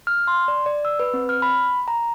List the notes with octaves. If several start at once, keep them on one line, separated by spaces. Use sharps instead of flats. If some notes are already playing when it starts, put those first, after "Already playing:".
F6
C6
D5
D5
E6
B4
C4
F6
B5
A#5